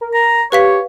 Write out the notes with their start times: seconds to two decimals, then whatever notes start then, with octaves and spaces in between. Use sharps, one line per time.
0.01 A#4
0.14 A#5
0.52 G4 B4 C#5 F5 B6